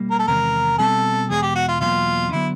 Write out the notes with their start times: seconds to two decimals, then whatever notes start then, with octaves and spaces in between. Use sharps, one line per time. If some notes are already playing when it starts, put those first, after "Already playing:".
Already playing: B2 G3 A#3
0.11 A#4
0.19 A4
0.27 E2 C3 D#3 G#3 A#4
0.78 B2 G3 C4 A4
1.30 E2 B2 G#3 G#4
1.43 G4
1.55 F#4
1.68 F4
1.81 E2 B2 F#3 A#3 F4
2.32 D3 F#3 B3 E4